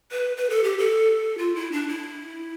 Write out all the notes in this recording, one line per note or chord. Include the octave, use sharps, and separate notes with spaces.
B4
B4
A4
G4
A4
F4
E4
D4
E4